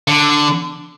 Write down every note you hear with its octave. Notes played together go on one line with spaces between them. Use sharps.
D3